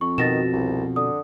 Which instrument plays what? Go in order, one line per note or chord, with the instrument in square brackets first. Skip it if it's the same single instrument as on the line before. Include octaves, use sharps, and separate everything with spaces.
[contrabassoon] F2 [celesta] C#6
[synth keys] B2 [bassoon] D#3 [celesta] A6 A#6 E7
[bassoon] C2
[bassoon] D3 [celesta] D#6